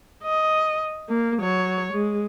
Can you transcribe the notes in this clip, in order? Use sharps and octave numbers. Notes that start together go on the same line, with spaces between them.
D#5
A#3
F#3 C#5
G#3